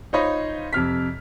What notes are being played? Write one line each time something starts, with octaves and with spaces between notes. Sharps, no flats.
D#4 F4 C5 C#5 D#5 B5
F2 C3 F6 B6